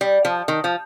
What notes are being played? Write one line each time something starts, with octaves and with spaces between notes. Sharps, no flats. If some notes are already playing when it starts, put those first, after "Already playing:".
G3
F3
D#3
F3